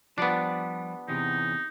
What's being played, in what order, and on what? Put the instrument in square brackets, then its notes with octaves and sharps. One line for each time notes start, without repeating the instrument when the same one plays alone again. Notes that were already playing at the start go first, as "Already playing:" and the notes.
[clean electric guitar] F3 G3 D5 [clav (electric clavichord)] B3 D4
[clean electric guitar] E2 C3 [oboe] D#4